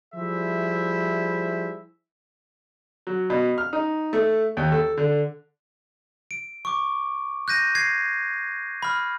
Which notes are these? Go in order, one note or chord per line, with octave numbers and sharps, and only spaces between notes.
F3 G3 E4 G#4 C5 E5
F#3
B2
F6
D#4
A3
D#2
A4
D3
D7
C#6 D6
F#6 G6 A#6 D#7
G#6 C7
B5 F6